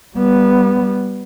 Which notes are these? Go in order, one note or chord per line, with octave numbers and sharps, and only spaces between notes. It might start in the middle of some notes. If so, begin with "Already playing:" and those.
G3 B3